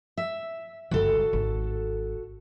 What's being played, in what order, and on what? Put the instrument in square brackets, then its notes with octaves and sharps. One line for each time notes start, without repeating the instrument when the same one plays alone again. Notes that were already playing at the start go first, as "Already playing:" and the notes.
[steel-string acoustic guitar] E5
[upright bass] G1 C#2 [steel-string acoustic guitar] F#4 A4
[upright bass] G#1